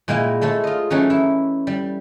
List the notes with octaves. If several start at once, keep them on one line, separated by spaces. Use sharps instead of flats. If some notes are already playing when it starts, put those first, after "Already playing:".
A#2 G#3 A#3 E4 G5 G#5
G#3 A3 A4 C#5
F4 D#5
E3 F#3 A3 C#4 D#4
E4
G3